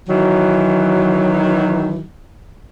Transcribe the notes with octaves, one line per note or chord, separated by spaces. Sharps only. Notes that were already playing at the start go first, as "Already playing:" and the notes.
D#3 E3 F#3